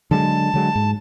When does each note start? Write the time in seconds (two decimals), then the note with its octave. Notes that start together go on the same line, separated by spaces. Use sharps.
0.11 D3 F#3 G#3 A5
0.54 D3 F#3 G#3
0.75 G#2